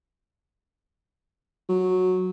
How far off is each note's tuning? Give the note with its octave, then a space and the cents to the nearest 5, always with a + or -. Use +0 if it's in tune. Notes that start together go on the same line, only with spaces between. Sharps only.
F#3 -10